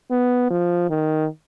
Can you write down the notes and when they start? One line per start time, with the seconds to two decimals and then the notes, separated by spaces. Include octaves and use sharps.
0.11 B3
0.50 F3
0.90 D#3